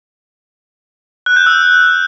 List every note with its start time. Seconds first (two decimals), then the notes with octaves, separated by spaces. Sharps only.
1.26 F#6
1.36 G6
1.46 E6